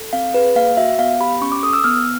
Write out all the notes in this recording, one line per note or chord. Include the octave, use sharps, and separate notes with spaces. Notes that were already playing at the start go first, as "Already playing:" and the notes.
Already playing: A4
C4 F5
G#4 B4
A#3 F5
F#4 E5
B3 F5
G4 B5
C#4 C#6
D6
A4 D#6
E6
B3 F6